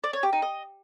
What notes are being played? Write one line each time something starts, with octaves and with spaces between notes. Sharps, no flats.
D5
C#5
G4
D#4
D#5